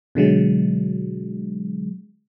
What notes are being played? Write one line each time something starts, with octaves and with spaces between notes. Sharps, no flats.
B2 D3 F#3 G#3